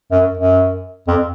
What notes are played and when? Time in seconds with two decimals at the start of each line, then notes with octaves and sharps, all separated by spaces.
0.11 F#2
0.37 F#2
1.08 F2